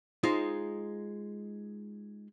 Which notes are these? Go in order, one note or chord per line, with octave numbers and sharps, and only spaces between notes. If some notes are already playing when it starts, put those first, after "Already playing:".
G#3 D#4 F4 C5